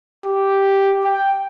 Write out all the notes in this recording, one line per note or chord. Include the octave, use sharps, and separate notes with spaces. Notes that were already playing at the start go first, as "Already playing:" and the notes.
G4
G5